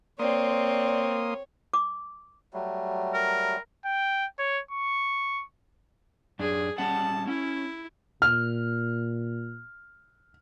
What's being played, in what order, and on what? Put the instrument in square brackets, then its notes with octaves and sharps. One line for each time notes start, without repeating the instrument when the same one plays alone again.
[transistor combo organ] A#3 C6 D#6 [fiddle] C4 [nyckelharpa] C#5 [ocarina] D5
[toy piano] D6
[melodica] F#3 G3 A3
[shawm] A#4
[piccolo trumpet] G5
C#5
C#6
[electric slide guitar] F#2 D4 [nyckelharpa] G#4
[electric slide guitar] G3 C#4 F#5 [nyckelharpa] A5
[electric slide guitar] C#4 [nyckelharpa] E4
[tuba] A#2 [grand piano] F6